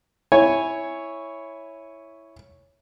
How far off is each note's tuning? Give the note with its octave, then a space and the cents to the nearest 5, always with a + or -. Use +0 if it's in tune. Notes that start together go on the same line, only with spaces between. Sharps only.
E4 +0 C#5 +0 G#5 -10